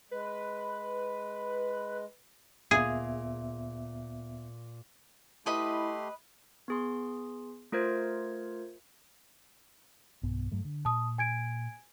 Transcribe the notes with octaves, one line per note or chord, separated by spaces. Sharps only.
G#3 B4
D2 A#2 B3 G#4 E5
A3 E4 G4 B4 D#5 B5 C6
B3 G#4 C6
A3 F4 A#4 C5 G#6
B1 G2 B3
G2 F#3 A3
D3
A#2 A5 D#6
G#5 G#6 D7